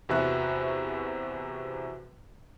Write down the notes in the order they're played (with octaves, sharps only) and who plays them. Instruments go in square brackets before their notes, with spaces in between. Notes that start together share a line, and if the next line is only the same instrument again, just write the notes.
[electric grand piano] E2 C3 F#4 B4 E5 F#6